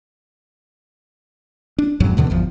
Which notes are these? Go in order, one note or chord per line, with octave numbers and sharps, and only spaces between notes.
D4
B1 F2 G#2 F#3
D#2 B2 D3 E3
G1 E2 F3